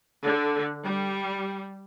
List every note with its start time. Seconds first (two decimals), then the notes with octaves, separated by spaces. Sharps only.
0.23 D3
0.82 G3